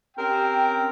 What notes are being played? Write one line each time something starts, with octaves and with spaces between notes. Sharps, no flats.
C4 C#4 G4 A#4 G5